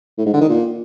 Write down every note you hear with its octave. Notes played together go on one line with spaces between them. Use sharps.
A2
G#2
D3
D#3
A#2